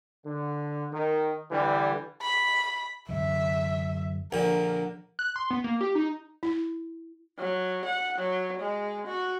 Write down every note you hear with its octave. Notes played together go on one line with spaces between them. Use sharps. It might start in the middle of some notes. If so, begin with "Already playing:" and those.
D3
D#3
D3 E3 G3
B5
F#2 D3 E3 E5
A#1 D3 A#4
F#6
C6
B3
A#3
G4
D#4
E4
F#3
F#5
F#3
G#3
F#4